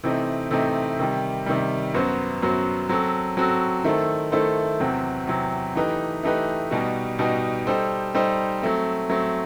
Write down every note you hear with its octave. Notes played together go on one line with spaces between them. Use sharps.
C3 E3 A3 C4 D#4
C3 E3 A3 C4 D#4
C3 D#3 G3
C3 D#3 G3
F#2 F#3 B3 F#4 C5
F#2 F#3 B3 F#4 C5
F#3 C4 F#4 A4
F#3 C4 F#4 A4
D#3 A3 E4 A4 C5
D#3 A3 E4 A4 C5
E2 C3 F#3 C4
E2 C3 F#3 C4
E3 A3 D#4 G4 B4
E3 A3 D#4 G4 B4
B2 G3 D#4 F#4
B2 G3 D#4 F#4
G3 D#4 A4 C5
G3 D#4 A4 C5
F#3 A3 C4
F#3 A3 C4